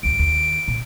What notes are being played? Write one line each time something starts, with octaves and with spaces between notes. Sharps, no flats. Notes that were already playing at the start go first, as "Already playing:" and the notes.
D2 G2 D7
D#2
A#2